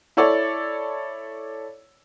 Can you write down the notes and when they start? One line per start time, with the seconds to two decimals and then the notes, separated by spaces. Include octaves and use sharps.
0.17 E4 A4 C#5 D5